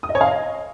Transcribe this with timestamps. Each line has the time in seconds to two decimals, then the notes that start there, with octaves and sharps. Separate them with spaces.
0.03 D#6
0.09 D#5
0.15 C#5
0.21 F5
0.27 D#5